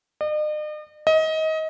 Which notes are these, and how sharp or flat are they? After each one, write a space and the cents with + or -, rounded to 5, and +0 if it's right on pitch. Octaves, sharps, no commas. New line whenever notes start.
D#5 -45
D#5 +25